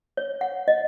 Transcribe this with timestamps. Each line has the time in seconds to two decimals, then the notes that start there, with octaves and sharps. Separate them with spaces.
0.17 C#5
0.41 F#5
0.68 D#5